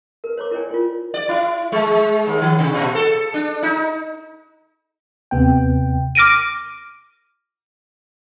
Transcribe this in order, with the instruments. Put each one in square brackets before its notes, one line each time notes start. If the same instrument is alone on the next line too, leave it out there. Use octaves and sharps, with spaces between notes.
[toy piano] A#4 B4
C5 C#5 A#5 D6
E4 A#4 C5 D5 G5 G#5
E4 F4
[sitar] D5
E4
G#3
G#3
D#2
D#3
C3
A#2
A4
D4
D#4
[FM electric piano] D#2 C3 B3 G5
[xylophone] D6 F6 A#6 D7 D#7